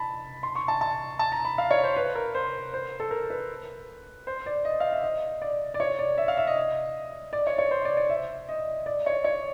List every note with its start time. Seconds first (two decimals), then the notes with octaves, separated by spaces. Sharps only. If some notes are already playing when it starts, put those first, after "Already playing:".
Already playing: A5 B5
0.43 C6
0.55 C#6
0.68 A5
0.81 A5
1.19 A5
1.32 A#5
1.45 B5
1.58 F5
1.71 C#5
1.84 C5
1.96 B4
2.15 A#4
2.35 C5
2.74 C5
3.00 A4
3.11 A#4
3.30 B4
4.27 C5
4.46 D5
4.65 D#5
4.80 F5
4.92 E5
5.03 D#5
5.41 D5
5.74 D5
5.80 C#5
5.99 D5
6.18 E5
6.28 F5
6.37 E5
6.47 D#5
7.33 D5
7.47 C#5
7.58 C#5
7.71 C5
7.85 D5
7.97 D5
8.09 E5
8.49 D#5
8.86 D5
9.06 C#5
9.24 C#5